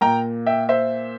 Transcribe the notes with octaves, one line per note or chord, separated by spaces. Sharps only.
A#2 G5 A#5
E5 G5
C5 E5